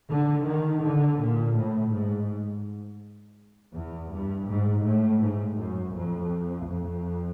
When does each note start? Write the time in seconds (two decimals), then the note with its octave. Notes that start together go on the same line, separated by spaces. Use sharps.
0.09 D3
0.46 D#3
0.83 D3
1.20 A#2
1.56 A2
1.92 G#2
3.74 E2
4.11 G2
4.47 G#2
4.83 A2
5.20 G#2
5.56 F#2
5.93 F2
6.66 F2